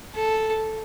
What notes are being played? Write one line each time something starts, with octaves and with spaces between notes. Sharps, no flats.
A4